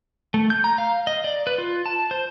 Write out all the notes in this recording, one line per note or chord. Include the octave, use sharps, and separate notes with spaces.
A3
G6
A#5
F5
D#5
D5
B4
F4
A5
C5